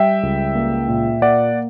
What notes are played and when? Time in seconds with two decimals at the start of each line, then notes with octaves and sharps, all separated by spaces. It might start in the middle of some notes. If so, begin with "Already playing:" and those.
Already playing: G3 E5 G5
0.23 C#2
0.55 A#3
0.88 A#2
1.22 A#3 D5 F#5